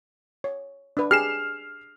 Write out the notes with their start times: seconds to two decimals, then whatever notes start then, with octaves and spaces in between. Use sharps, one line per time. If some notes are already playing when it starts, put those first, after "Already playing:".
0.44 C#5
0.97 D4 B4
1.11 G4 G#4 F6 C7 E7